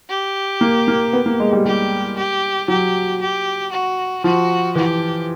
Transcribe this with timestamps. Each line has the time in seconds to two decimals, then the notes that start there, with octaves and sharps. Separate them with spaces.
0.09 G4
0.61 A#3
0.88 A#3
1.13 B3
1.26 A#3
1.40 G#3
1.53 G3
1.65 G3 G4
2.17 G4
2.68 F#3 G4
3.21 G4
3.72 F#4
4.24 F3 F#4
4.75 E3 G4